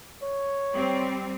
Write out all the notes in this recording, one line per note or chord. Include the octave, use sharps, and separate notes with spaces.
C#5
G3 C4